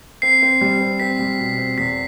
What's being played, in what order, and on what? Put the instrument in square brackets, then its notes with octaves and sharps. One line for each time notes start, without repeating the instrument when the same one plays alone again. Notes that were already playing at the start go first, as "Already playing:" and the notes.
[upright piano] C4 [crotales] C7
[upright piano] C4
G3
C4
[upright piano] C4 [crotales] B6
[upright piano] G3
B2
C4
[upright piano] E2 [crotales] B6